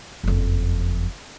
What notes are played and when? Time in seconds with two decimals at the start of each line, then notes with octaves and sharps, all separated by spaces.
0.24 F#1 F2